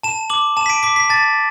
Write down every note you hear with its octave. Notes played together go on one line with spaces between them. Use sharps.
A5 E7
D6 F#7
A5 E7
B6
D7
D6 B6
B6
A5 A6